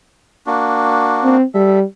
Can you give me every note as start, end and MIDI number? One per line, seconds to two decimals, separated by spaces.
0.47 1.37 58
0.47 1.37 62
0.47 1.37 66
1.24 1.44 60
1.54 1.83 55
1.54 1.79 69
1.54 1.79 76